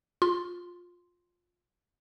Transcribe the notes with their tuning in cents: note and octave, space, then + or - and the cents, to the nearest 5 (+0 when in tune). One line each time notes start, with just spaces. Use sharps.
F4 +15 C6 +0